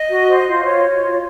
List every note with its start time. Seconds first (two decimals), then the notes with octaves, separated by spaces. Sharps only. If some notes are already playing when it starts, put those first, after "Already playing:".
Already playing: D#5
0.10 F#4
0.28 C5
0.47 F4
0.66 F4 C#5
0.84 F4
1.03 F4